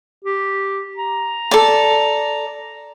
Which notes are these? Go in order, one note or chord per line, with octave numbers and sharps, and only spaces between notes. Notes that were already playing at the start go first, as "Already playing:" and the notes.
G4
A#5
A4 D5